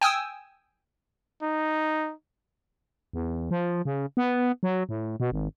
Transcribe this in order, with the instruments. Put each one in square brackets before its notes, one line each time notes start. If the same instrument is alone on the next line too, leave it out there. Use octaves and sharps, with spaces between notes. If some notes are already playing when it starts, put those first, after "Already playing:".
[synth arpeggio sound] G5 G#5 D#6 E6
[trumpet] D#4
[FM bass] E2
F3
C#3
B3
F#3
A2
B2
G#1